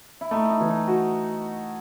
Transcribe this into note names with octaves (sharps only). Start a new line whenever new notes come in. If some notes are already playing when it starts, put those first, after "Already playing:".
E4
A3 D#4
D#4
E3
D#4
F#4